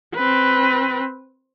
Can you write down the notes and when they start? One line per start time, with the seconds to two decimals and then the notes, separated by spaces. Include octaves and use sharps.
0.15 C4 B4